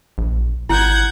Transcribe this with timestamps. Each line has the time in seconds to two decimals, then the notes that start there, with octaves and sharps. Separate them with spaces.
0.18 A#1
0.69 G#1 E4 F#5 G6 G#6